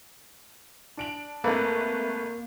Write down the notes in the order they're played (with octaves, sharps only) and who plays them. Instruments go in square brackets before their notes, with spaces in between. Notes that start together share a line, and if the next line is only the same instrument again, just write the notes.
[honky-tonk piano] D4 D7 F#7
[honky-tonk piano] G#1 A3 B4 [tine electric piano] A#3